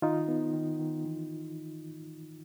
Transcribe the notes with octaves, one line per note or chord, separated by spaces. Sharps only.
D#3 D#4 F4
B3
D#3
D#3
E3